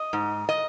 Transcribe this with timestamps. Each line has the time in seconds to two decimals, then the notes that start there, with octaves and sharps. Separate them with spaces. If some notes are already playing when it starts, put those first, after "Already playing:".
Already playing: D#5
0.13 G#2
0.49 D#5